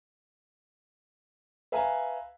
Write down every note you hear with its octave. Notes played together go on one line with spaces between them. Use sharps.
B4 E5 F5 G#5 A#5